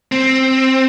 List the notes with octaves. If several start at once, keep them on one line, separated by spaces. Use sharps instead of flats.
C4